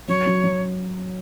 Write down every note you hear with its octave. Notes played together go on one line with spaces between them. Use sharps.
F#3 C#5
F#3
F#3